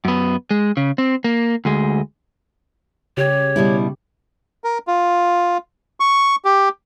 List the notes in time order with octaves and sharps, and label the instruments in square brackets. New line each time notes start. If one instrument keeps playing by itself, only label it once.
[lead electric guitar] F#2 B3
G#3
C#3
C4
A#3
D2 G#3
[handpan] C#3 G4 [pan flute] C#5
[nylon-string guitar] B2 G3 E4
[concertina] A#4
F4
C#6
G4